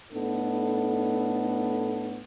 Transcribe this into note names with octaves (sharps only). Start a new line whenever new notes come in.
A2 B3 D4 D#4 A4